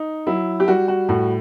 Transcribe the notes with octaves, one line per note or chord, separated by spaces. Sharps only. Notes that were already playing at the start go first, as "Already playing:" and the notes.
Already playing: D#4
F#3 E4
G4
G3 F#4
F#4
A2 F#4